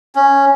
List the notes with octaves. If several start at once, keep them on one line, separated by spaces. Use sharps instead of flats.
C#4